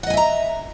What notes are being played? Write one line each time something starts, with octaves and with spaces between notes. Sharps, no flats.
D#5 E5 F#5 G#5 A#5